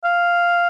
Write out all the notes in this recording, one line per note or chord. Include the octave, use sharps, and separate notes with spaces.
F5